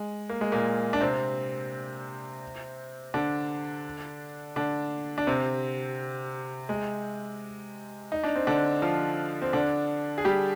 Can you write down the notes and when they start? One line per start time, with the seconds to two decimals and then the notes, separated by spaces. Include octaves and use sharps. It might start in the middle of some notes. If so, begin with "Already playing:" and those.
Already playing: G#3
0.29 A#3
0.41 G#3
0.52 A#2 A#3
0.93 D4
1.00 C3 C4
3.14 D3 D4
4.56 D3 D4
5.18 D4
5.27 C3 C4
6.69 G#3
8.12 D#4
8.23 D4
8.35 C4
8.47 D3 D4
8.82 F3 F4
9.42 C4
9.53 D3 D4
10.18 G#4
10.25 G3 G4